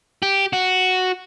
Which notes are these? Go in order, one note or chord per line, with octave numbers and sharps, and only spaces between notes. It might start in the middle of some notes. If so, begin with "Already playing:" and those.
G4
F#4